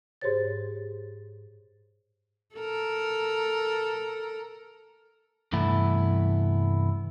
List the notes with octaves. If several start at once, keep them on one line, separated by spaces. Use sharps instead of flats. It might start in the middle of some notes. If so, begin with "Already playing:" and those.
G#2 G4 G#4 C5 C#5 A6
A4 A#4
C2 G2 E3 A3 B3 E4